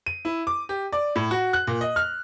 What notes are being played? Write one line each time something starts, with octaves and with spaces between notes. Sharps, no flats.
D#7
E4
D6
G4
D5
A2
F#4
F#6
A#2
D#5
F6